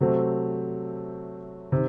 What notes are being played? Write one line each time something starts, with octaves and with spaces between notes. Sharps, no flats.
C3 F#3 A3 C4
C3 D#3